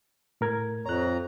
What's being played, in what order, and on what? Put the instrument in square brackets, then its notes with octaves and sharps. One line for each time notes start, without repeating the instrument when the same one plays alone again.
[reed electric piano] A2 A#4 G#6
[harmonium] F2 A#5 [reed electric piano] C#5 F#6